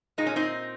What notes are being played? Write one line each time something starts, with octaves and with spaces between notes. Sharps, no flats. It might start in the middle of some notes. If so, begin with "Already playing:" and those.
A#2 G#3 D#4
C#4
C4 D#4